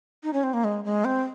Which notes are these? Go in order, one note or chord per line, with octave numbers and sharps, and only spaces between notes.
D#4
C#4
C4
A#3
G#3
G#3
C4